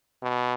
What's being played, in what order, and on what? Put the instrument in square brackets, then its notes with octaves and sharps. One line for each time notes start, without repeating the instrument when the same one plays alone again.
[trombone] B2